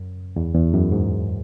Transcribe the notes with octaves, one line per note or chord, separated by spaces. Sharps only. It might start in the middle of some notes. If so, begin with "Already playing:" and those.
Already playing: F#2
E2
E2
F#2
G#2